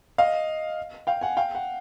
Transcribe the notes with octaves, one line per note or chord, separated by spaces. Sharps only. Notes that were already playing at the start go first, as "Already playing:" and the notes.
D#5 F5
F5 G5
F#5 G#5
F5 G5
F#5